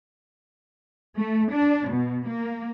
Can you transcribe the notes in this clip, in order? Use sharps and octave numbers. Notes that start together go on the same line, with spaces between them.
A3
D4
B2
A#3